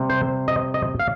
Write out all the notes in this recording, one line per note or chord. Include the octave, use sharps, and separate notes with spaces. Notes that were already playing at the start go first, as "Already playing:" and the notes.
Already playing: C3 G3
C5
D#5
D#5
F5